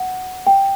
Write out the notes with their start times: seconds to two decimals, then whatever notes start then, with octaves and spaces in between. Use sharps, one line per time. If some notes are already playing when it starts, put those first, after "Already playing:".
Already playing: F#5
0.47 G5